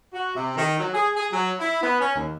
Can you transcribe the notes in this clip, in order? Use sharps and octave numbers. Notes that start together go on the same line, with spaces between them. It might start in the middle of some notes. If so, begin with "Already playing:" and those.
F#4
C3
D#3
F#3
G#4
G#4
F#3
E4
B3
C#4
D#2